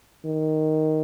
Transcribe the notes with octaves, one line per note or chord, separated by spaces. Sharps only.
D#3